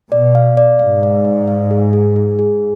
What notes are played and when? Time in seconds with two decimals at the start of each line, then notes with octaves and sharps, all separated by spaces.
0.11 B2 D5
0.35 F5
0.57 D5
0.79 G#2 F5
1.03 D5
1.25 D5
1.48 F5
1.71 G#4
1.93 G#4
2.16 G#4
2.39 G#4